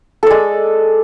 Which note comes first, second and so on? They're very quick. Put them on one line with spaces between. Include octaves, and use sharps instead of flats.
A4 D5 G#3